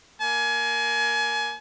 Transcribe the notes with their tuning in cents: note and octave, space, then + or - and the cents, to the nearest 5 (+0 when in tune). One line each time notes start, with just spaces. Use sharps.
A#3 +0 G#5 +30